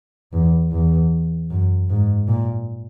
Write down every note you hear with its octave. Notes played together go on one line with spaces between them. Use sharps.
E2
E2
F#2
G#2
A#2